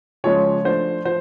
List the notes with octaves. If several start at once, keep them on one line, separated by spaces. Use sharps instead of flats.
C#3 F3 G#3 C#5
F3 A3 D4 C5
F3 C5